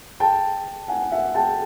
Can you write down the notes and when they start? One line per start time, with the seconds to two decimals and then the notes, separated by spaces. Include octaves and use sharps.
0.20 G5 A5
0.88 F#5 G#5
1.11 E5 F#5
1.35 G5 A5